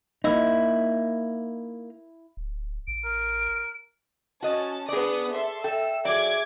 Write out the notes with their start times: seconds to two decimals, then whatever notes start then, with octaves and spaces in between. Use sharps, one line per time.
0.24 A#3 D#4 E4
2.37 D1
2.87 A1 D7
3.04 A#4
4.43 C#4 F#4 D#5 A5
4.89 B3 D4 G#4 D5 D#6
5.32 A4 E5 C6
5.64 A4 E5 G5 E6
6.05 F#3 G#4 D5 E5 D6 G#6